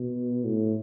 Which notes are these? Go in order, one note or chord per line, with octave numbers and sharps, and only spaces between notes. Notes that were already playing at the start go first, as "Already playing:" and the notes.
Already playing: B2
A2